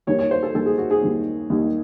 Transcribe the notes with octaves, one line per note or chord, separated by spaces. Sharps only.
D#2 D#3 G3 C#5
C#5
C5
A4
D#2 D#3 G3 A4
G#4
F#4
G#4
D#2 D#3 G3
D#2 D#3 G3